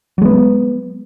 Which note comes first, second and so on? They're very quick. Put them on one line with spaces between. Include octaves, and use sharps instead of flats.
F#3 G#3 B3